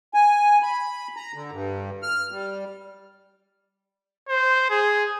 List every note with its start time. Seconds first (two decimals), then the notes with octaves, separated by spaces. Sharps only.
0.14 G#5
0.62 B5
1.16 A#5
1.34 D3
1.52 G2
2.03 F6
2.31 G3
4.28 C5
4.69 G#4